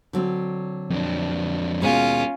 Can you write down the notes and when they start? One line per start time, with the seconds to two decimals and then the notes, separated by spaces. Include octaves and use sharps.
0.13 D3 F#3 C4
0.90 F2 D4
1.82 D#2 B2 G#3 C#4 F4